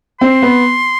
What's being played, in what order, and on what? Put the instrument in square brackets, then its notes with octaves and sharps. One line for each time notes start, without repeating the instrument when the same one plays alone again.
[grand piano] C4 [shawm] C6
[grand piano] B3